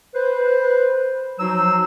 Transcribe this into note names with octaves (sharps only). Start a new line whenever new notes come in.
B4 C5
F3 F#3 D#4 F#4 C5 E6